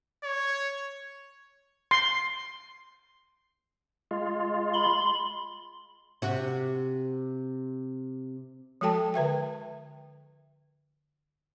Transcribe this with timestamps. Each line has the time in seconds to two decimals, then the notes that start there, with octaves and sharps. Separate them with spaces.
0.24 C#5
1.91 C6
4.11 G#3 F4
4.74 B5 C6
6.22 C3 F#4
8.81 F3 G#3 F#4 A4 G5 A5
9.14 D3 B4 E5 G5